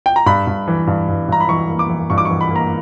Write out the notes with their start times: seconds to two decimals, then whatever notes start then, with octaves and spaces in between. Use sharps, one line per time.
0.06 G5
0.16 A#5
0.26 G2 B5
0.47 G2
0.68 E3
0.87 G2
1.08 G2
1.28 G2 A#5
1.41 B5
1.49 E3 C#6
1.69 A#3
1.79 D6
1.90 E3
2.10 G2 C#6
2.18 D6
2.25 E3 C#6
2.41 B5
2.51 A#3
2.56 A#5